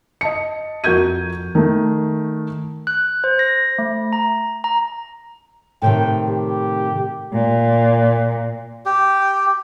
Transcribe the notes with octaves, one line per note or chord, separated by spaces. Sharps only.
D#5 A5 C#7
F2 F#4 A#4 G6 G#6 D#7
D#3 A3
F#6
C5
A#6
A3
A#5
A#5
A2 C3 D#3 G5
G4
A#2
G4